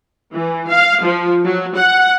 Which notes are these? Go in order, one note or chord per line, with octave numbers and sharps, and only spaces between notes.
E3
F5
F3
F#3
F#5